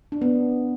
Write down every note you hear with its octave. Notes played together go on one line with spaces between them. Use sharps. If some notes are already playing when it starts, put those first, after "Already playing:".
D4
B3